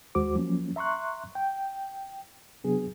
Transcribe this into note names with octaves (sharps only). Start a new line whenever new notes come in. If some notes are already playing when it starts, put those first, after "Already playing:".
D#2 G#3 F#4 C5 D6
F3 F#3 A#3 C#4
E5 A#5 C6 C#6 F#6
G5
C3 F#3 B3 D4 G#4